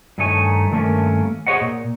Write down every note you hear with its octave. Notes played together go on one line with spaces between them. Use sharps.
G2 D#3 A3 D#4 C#5 G#5
G2 D#3 A3 A#3 C#4
G#4 C5 C#5 D#5 F#5
A#2